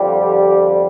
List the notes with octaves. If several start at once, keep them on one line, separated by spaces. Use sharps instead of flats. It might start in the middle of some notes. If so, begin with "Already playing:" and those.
Already playing: F2 D3 G3
G4